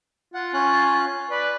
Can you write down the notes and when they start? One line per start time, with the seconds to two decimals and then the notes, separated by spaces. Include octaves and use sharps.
0.34 F4 F#5
0.54 C#4 F#6
1.31 B4 D5